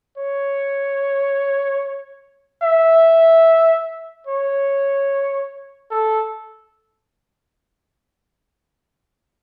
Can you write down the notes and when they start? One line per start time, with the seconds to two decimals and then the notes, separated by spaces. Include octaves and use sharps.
0.17 C#5
2.63 E5
4.27 C#5
5.91 A4